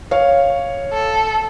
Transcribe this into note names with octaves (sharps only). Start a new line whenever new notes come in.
C#5 F5
A4